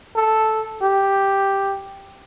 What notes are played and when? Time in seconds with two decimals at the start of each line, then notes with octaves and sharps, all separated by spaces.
0.16 A4
0.82 G4